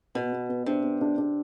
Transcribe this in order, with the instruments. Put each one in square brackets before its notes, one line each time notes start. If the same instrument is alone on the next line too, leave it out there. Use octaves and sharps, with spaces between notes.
[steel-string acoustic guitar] B2 [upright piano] B3
[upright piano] B3
B3
[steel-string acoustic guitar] C3 [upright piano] D4
[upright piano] B3
D4
D4